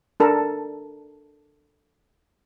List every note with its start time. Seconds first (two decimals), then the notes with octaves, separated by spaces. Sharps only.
0.20 D4 A4 A#4